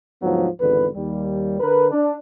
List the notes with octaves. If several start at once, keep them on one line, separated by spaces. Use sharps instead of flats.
D2 G#2 F3 F#3 B3
G#1 E2 D3 B4
D#2 G3
D3 A#4 B4
D4